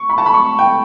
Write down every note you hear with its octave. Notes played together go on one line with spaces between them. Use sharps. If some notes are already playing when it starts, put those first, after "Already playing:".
Already playing: C#6
B5
A5
B5
C#6
G5